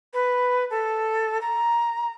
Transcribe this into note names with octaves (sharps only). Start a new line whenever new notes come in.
B4
A4
A#5